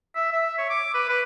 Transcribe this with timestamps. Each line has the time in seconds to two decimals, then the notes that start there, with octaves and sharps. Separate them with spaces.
0.16 E5
0.32 E5
0.58 C#5
0.70 D6
0.95 B4
1.09 B4